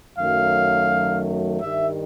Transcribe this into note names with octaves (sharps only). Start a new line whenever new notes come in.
F#2 D#3 F#3 A3 F5
G2 D#3 G3 E5